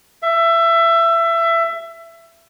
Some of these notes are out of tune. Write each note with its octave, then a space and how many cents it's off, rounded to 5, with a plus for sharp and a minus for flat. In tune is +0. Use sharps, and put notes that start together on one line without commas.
E5 +20